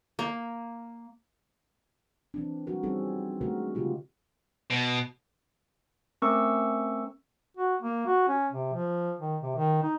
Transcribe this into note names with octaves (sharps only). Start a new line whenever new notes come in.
A#3
E3 C4 D4
F3 G3 F#4 A#4
G3 C4 C#4 D#4 G#4 A4
D3 G#3 A3 C#4 F#4 A#4
C#3 F3 F4 G4
B2
A3 C4 C#4 A#4 C#6 E6
F#4
A#3
F#4
C#4
C3
F3
D#3
C3
D#3
D#4